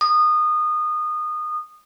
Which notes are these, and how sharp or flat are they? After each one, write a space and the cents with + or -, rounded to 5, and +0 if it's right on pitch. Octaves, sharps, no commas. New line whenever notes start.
D#6 -25